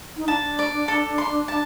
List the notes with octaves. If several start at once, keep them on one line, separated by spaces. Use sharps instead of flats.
D#4
D4 A5
D5
A4
C6
A5